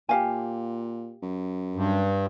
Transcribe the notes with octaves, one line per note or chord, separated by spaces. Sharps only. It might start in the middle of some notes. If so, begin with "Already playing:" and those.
A#2 G4 F5 G#5
F#2
G2